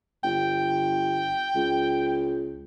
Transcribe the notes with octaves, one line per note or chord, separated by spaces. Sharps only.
G1 G5
C#2